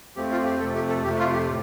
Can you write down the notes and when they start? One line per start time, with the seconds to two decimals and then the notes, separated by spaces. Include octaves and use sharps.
0.16 F2 F3 A3 C4 G4
0.32 F4
0.45 G4
0.60 F2 C3 A3 A4
0.75 G4
0.89 A4
1.04 F2 C3 A3 G4
1.19 F4
1.33 G4
1.48 A2